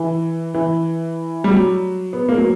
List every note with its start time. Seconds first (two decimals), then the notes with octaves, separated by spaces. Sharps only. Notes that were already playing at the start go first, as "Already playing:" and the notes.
Already playing: E3
0.54 E3
1.44 G3
1.50 F#3
2.13 B3
2.29 A#3
2.38 F#3